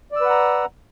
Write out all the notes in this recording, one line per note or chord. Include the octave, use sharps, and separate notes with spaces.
B4 D5 F#5 A#5 E6